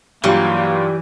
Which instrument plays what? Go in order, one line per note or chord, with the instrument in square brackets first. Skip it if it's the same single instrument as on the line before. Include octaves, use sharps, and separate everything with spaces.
[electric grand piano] G2 F#3 F4 [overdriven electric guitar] E3 [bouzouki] G3 [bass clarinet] A#3